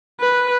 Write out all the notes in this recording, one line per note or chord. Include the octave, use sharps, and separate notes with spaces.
B4